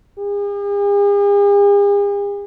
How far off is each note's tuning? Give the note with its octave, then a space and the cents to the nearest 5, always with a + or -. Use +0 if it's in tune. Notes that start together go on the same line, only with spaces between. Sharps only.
G#4 -45